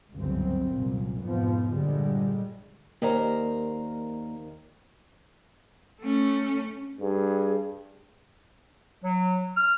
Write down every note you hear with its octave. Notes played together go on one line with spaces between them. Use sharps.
G1 C#2 F#2 C#3 C4
C2 F#2 A#2
F2 G#2 B2 F3 B3
A#1 G2 D3 G3 G#3
D#2 A#3 A#4 C5 D5 A#5
A3 C#4
G2 G#4
F#3
F6